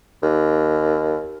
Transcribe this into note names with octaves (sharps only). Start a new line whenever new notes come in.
D#2